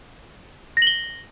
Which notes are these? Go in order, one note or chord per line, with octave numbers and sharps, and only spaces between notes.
A#6 F#7 G7